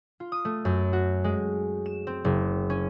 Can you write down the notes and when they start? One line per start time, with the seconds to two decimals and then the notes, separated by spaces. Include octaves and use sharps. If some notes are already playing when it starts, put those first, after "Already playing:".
0.20 F4
0.32 D#6
0.45 A3
0.65 F#2
0.93 F#4
1.24 G#3
1.86 E7
2.07 C4
2.25 F#1
2.70 C#4